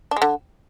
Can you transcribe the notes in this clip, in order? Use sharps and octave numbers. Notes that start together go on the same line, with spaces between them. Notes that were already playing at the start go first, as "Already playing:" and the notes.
D4
G#3
D3